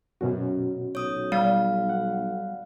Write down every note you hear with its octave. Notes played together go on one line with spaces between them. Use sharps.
F#2 B2 C#4 F#4
B1 C#5 D#6
G3 F5
F#5